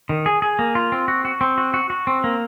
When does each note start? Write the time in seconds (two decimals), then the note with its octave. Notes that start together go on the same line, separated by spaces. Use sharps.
0.09 D#3
0.26 G#4
0.42 G#4
0.59 A#3
0.75 F4
0.92 C4
1.08 F#4
1.25 F#4
1.41 C4
1.58 F#4
1.74 F#4
1.90 F#4
2.07 C4
2.24 A#3